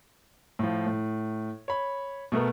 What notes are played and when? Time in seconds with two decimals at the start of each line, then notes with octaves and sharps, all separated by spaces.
0.59 A2 F3
0.87 A2
1.68 C#5 B5
2.32 B2 A3 B3 A#4